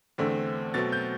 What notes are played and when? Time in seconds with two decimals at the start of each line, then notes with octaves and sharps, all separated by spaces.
0.18 E2 D3 A3 C4
0.74 B2 F#3 A3 C4 A6
0.92 G6